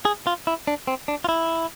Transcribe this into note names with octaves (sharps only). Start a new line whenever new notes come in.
G#4
F4
E4
D4
C4
D4
F4
E4